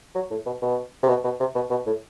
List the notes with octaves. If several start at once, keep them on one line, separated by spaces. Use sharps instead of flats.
F#3
A2
B2
B2
C3
B2
B2
C3
B2
B2
A2